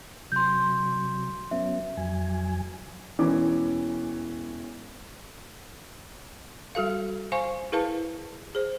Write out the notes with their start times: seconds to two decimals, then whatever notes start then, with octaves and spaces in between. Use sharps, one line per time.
0.32 C3 F#3 C6 G6
1.51 F#3 B3 C#4 E5
1.97 F2 F#3 G#5
3.19 E1 E3 C#4 D6
6.75 G3 F#4 A4 F5
7.32 C5 F5 G#5 C6 C#6
7.72 E4 G#4 A#4 B4 F5 A5
8.55 G#4 C5